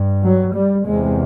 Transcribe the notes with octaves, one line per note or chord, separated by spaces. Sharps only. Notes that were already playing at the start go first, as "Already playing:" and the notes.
Already playing: G2
F#3
G3
E2 C3 G#3